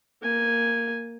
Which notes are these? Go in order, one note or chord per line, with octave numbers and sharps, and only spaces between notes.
A#3 G#5